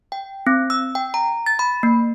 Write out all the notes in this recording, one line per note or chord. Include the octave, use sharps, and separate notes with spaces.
G5
C4
E6
G5
A#5
A6
B5
A#3